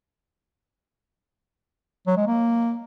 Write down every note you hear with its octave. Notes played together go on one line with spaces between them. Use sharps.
F#3
G#3
A#3